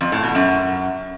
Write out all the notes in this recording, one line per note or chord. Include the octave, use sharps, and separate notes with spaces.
F2
A2
B2
F#2